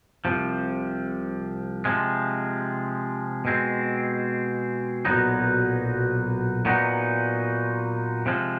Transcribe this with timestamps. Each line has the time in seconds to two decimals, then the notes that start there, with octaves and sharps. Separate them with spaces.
0.25 C2 C3 F3
1.85 C3 F3 G#3
3.45 B2 G#3 C4
5.05 B1 A#2 F#3 B3 D#4
6.65 A#2 F#3 B3 D#4
8.26 C3 F3 G#3